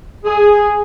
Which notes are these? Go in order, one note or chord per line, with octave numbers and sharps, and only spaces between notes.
G#4